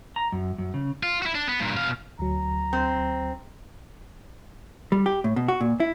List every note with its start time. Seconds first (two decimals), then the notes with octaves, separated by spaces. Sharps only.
0.16 A#5
0.32 F#2
0.58 F#2
0.74 C#3
1.03 F4
1.22 E4 F#4
1.35 D4
1.49 B3
1.60 G2 A#2
1.76 B2 F5
2.19 D2 F#3 A#5
2.73 C4
4.92 G3
5.06 G4
5.24 A2
5.36 B2
5.48 F#4
5.61 A#2
5.80 E4